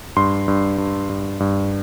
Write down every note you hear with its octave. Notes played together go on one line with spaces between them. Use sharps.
G2 C6
G2
G2
G2
G2